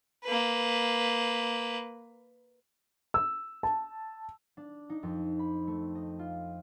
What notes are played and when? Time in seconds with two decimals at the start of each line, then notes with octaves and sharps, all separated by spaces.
0.24 A#3 B4
3.14 E6
3.63 A5
4.57 D4
4.90 D#4
5.03 F2
5.39 B5
5.67 A3
5.95 D#5
6.19 F4